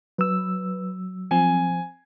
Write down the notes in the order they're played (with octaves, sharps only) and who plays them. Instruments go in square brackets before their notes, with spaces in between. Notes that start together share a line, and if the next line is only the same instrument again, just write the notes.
[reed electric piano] F#3 E6 [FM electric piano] B4
[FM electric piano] F3 C4 [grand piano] G#5